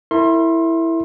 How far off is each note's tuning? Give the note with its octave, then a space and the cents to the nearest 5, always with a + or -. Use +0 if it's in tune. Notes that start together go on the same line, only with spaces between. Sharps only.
E4 +0 A#4 -45 C6 +25